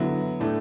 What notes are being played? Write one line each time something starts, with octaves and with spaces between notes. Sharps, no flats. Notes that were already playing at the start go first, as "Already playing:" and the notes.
Already playing: D3 F#3 B3 E4
A2 A3 D4